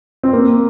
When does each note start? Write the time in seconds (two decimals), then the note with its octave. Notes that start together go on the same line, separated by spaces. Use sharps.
0.23 C4
0.33 A#3